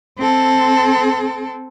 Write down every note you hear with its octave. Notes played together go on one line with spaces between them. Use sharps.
C4 A4